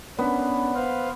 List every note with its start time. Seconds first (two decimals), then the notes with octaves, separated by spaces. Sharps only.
0.19 B3 C#4 D4
0.75 B4 C5 F5